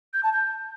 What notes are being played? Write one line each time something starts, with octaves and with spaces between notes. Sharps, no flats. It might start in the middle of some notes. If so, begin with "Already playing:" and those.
G6
A5
G6